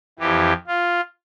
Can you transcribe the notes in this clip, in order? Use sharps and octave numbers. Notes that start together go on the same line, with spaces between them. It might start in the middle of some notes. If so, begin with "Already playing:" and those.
F2 E3 G4
F4